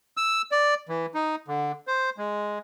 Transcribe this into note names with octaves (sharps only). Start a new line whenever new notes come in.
E6
D5
E3
D#4
D3
C5
G#3